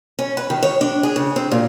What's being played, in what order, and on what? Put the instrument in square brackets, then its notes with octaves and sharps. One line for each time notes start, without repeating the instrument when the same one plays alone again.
[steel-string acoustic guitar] C#4
B4
D#3
C#5
D4
G#4
C#3
C4
A#2